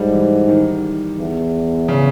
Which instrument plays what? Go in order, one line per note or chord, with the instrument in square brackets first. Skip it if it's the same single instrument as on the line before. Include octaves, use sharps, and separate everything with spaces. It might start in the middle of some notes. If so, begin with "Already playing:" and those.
Already playing: [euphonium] G#2 [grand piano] G3
[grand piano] E3
D#3
[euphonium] E2
[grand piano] C#3